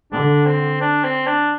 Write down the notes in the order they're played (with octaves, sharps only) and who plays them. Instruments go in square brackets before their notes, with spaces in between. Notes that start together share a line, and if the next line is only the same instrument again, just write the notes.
[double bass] D3 [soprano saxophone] D4
[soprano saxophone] C4
D4
C4
D4